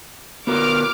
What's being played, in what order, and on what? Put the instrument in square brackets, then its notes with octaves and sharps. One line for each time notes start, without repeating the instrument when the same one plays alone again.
[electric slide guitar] B3 F#4 A#4 [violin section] D6 F6